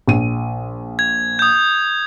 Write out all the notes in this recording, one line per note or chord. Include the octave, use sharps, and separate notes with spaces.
A#1 D#7
G#6
D#6 G6